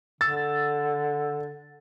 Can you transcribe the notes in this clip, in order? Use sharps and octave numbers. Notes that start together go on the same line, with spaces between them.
D3 E6 A6